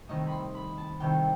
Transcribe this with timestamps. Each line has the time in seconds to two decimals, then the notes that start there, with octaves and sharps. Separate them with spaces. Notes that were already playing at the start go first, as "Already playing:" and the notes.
0.09 C2 C3 D#3 A3 D#5
0.27 B5 C6
0.55 B5
0.78 A5
1.00 C2 C3 D#3 A3 G5